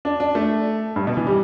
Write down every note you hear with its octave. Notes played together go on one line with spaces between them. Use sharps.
D4
D4
A3
G2
B2
E3
G3